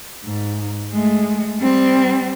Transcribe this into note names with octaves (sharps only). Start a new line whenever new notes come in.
G#2
G#3 A3
G3 C4